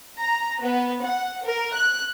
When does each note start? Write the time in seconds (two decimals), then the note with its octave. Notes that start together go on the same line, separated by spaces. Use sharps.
0.19 A#5
0.63 B3
1.04 F#5
1.45 A#4
1.75 F#6